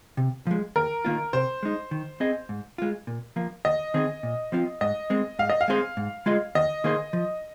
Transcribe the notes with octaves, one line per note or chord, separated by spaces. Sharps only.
C3
F3 G#3
D#2 A#4
D#3 A#3 F4
C3 C5
G#3 D#4
D#3
C4 G#4 D#5
G#2
G#3 F4
A#2
F3 A#3
D#2 D#5
D#3 C4 G#4
A#2
F3 C4 F4
G#2 D#5
G#3 C4
G#2 F5
D#5
F5
G#3 C4 G#4 C5
G#2
G#3 F4 G#4 D#5
D#2 D#5
D#3 A#3 G#4 C5
F3